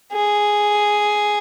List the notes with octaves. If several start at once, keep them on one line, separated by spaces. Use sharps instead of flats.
G#4